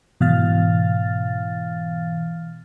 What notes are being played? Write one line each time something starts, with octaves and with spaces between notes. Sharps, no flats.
G#2 B2 E3 F5 F6 A6